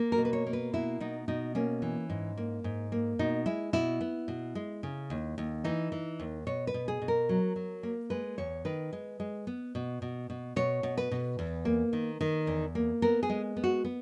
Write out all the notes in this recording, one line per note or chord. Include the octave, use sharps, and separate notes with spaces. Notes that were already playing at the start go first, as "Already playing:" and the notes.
Already playing: A#3
A#4
B2
B4
C#5
A#3
B4
B2 E4
B2 D#4
B2 D#4
A#3 C#4
E3
G#2
A#3
G#2
A#3
B2 D#4
G#3 E4
B2 E4
B3
B2
G#3
C#3
D#2
D#2
E3 D#4
E3
D#2
B2 C#5
B4
B2
G#4
B2
A#4
F#3
F#3
A#3
G#3 B4
E2 C#5
D#3 B4
G#3
G#3
B3
B2
B2
B2
B2 C#5
B2
B4
B2
E2
A#3
D#3
D#3
E2
A#3
B3 A#4
G#4
G#3
B3
F#4
B3